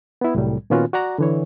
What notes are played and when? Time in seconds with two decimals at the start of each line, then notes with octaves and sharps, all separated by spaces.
0.21 B3 E4
0.35 C2 A2 F#3 G3
0.70 A#2 D#3 B3 C#4 F4 F#4
0.93 F#4 D5 F#5 A#5
1.18 D3 E3 C#5